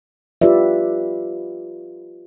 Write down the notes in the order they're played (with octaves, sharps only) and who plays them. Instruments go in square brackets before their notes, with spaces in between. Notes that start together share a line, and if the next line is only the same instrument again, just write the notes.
[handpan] F4 G4 B4 D5 E5